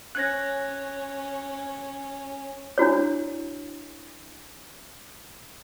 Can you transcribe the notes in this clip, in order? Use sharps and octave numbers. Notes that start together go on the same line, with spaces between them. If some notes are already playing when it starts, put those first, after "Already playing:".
C#4 F#6 G#6 A#6
D4 E4 F#4 C#5